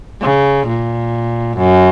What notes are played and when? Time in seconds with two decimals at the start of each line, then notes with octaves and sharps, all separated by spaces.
0.21 C#3
0.67 A#2
1.57 F#2